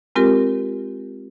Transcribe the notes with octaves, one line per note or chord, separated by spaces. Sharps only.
G#3 C4 F4 G4 A#4